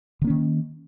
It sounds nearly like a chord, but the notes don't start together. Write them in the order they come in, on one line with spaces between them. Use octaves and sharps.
D3 A#3 C#4 D#3